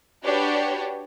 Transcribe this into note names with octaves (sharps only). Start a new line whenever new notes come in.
D4 F#4 G4 B4 C#5